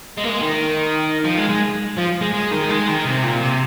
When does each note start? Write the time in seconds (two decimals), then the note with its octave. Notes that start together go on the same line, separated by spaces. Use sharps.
0.17 G#3
0.24 A#3
0.29 G#3
0.41 D#3
1.25 F3
1.37 G#3
1.49 G#3
1.97 F3
2.21 G#3
2.33 G#3
2.51 D#3
2.69 G#3
2.88 D#3
3.05 C3
3.23 A#2
3.41 C3